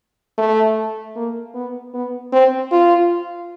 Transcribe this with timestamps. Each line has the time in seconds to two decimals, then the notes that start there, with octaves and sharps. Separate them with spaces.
0.38 A3
1.16 A#3
1.55 B3
1.94 B3
2.33 C4
2.72 F4